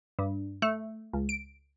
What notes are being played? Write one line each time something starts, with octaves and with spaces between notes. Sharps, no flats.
G2
A3
C#2
D7